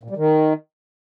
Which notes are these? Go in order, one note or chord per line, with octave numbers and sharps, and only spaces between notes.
A#2
G3
D#3